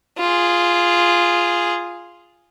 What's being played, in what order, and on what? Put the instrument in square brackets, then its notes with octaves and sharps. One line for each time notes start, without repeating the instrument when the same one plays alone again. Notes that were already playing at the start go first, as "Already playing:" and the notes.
[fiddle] F4 G#4